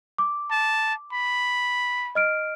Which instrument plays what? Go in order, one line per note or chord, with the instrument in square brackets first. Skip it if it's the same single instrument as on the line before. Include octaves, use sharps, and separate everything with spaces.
[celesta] D6
[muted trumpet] A5
B5
[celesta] D#5 F6 D7